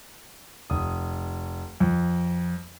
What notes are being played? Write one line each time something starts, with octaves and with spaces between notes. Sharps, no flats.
F1 D#6
F2